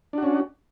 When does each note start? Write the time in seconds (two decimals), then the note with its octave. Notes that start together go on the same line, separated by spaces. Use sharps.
0.13 D4
0.18 F#4
0.23 C#4